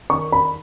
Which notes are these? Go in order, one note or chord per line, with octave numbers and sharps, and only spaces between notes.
D#3 C#6
B5